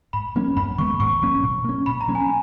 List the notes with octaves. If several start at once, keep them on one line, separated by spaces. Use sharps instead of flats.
G#2 B5
F#3 A#3 C#4
F#2 B5
D#3 G#3 B3 C#6
G#2 C#6
F#3 A#3 C#4
B2
A#3 C#4
B2 B5
A#5
F#3 A#3 C#4
G#5